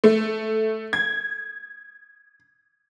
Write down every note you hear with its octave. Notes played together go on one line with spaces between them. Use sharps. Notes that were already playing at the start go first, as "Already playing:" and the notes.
A3
G#6